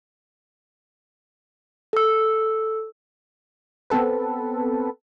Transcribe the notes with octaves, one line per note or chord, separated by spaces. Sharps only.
A4 E6
B3 C4 A4 B4